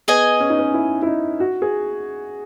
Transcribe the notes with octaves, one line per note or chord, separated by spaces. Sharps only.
B3 G#4 D#5 G#5
C#4
D#4
C#4
E4
E4
D#4
F#4
G#4